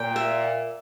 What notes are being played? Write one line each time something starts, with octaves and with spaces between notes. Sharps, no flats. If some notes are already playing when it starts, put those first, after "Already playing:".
Already playing: A#2 G5
E5